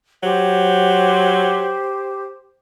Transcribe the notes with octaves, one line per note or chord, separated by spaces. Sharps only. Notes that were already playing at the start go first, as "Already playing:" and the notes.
F#3 G4 C5